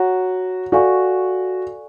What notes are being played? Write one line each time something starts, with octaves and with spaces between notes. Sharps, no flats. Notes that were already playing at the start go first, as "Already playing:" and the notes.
Already playing: F#4 C#5 F#5 A#5
F#4 A4 D5 F5 G#5 C#6